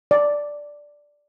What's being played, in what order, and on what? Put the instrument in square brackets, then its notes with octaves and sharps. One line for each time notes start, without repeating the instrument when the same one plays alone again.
[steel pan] D5